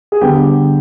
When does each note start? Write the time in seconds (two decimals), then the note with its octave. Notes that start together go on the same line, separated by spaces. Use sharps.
0.12 G#4
0.21 D3 G3 B3 G4